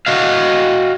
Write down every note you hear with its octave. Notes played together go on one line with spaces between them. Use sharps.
F#4 D#5 F5